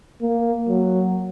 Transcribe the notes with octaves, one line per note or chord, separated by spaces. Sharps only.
A#3
F#3